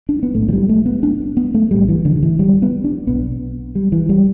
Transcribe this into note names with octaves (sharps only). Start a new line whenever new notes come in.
D4
B3
B1 A2 A3
E3
G3
A3
B3
D4
B3
A3
B1 A2 G3
E3
D3
D3
E3
G3
B3
D4
B1 B2 B3
G3
E3
G3